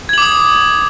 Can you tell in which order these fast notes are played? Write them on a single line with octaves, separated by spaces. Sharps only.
G#6 F#7 D6 D#6